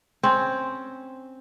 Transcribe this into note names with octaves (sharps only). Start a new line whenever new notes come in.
C4 C#4